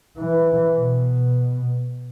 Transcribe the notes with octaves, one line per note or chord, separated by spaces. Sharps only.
E3
B2